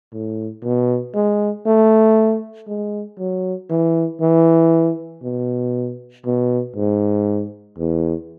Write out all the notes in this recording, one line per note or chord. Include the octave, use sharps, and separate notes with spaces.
A2
B2
G#3
A3
G#3
F#3
E3
E3
B2
B2
G#2
E2